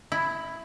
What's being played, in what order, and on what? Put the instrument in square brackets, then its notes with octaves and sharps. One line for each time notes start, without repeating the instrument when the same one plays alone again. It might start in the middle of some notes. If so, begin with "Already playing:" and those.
[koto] E4